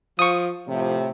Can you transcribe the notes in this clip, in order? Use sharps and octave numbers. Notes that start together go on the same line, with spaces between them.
F3 C#6 D#6
A2 C3 F3